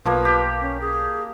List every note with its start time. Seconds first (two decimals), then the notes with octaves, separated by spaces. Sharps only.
0.06 B1 F3 A#3 B4
0.25 G4
0.61 C#4
0.81 G#4